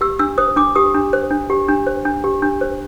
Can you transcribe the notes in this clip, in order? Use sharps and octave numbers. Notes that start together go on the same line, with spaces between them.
G4 E6
D4 E6
C5 D#6
D4 D6
G4 D#6
D4
C5
D4
G4
D4
C5
D4
G4
D4
C5